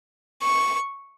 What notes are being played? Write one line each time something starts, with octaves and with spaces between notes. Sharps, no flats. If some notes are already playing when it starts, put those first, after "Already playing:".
C#6